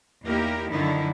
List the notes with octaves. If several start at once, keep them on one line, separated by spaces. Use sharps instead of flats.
E2 A#3 D#4 E4 G4 A#4
F#2 D3 D#3 F3 D#4 E4